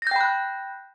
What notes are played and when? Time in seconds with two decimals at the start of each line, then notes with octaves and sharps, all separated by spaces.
0.02 A#6
0.07 G6
0.11 G5
0.16 B5
0.21 F#6